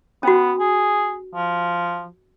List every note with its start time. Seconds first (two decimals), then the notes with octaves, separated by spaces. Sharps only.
0.23 B3 C#4 F#4
0.60 G#4
1.35 F3